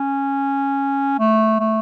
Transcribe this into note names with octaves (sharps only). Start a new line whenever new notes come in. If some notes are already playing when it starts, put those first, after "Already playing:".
Already playing: C#4
A3
A3